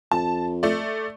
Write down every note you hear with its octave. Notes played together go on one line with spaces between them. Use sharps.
F2 A5
A3 D5